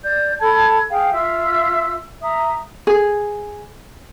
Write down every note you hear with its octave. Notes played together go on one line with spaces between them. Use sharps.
D5 G6
A4 A5 B5 G#6
G#4 F5 G5
F4 E5 E6
E5 A#5 D#6
G#4